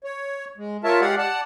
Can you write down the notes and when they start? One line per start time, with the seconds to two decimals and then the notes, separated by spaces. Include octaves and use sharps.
0.04 C#5
0.57 G#3
0.84 F4 A#4 C#5 E5 A5
1.01 G#3 G4 D5 F5 F#5
1.18 D5 F#5 A5